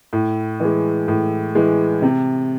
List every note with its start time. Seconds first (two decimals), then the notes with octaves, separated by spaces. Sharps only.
0.13 A2
0.60 E3 G#3
1.08 A2
1.55 E3 G#3
2.02 C3